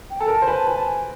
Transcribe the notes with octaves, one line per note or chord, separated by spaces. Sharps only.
G5
A4 G#5
A#4 A5
C5
B4 G#5
A5
B4 G#5
A5
G#5